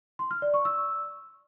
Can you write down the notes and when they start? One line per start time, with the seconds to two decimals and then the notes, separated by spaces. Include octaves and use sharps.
0.19 C6
0.31 F6
0.42 D5
0.54 C#6
0.65 E6